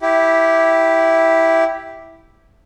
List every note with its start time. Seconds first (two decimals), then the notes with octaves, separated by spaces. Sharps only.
0.02 E4 G4